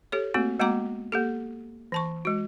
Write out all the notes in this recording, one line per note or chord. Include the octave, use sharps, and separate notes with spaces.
G4 A4 C#5
A3 A#3 C4 F#4
G#3 A#3 B3 F#4 A#5 D6
A#3 G4 A4
E3 A5 C#6
G#3 F#4